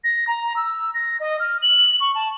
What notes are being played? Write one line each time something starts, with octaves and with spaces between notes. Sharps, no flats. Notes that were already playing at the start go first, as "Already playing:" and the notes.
A#6
A#5
E6
A#6
D#5
F6
F#7
C#6
A5